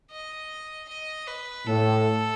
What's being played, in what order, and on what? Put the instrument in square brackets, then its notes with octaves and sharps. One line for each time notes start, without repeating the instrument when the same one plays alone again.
[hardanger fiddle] D#5
D#5
B4
[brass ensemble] A2 [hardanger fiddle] A4